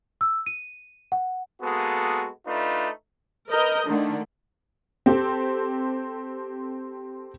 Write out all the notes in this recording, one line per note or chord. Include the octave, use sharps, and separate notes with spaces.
E6
D#7
F#5
G#3 A#3 B3 F#4 A4
A3 D4 D#4 F4 B4
A#4 B4 D#5 G6
D3 D#3 A3
C4 G4 A4